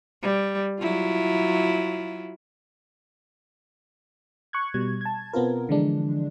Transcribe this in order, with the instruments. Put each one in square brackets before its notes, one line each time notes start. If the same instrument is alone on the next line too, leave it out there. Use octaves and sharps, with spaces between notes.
[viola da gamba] G3
F#3 E4 F4
[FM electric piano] C#6 F#6 G#6
B2 G3 G#6
A5 G#6
B2 B3 C4 F4 A#4
D3 E3 F3 G#3 D4